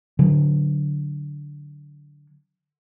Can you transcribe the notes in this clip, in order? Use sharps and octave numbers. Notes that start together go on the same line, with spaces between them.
D3 F#3